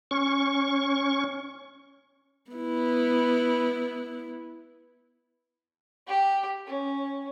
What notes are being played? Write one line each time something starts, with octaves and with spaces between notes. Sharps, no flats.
C#4 C#6
B3 E4
G4
C#4